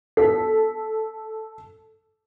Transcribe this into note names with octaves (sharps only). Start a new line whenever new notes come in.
A4 B6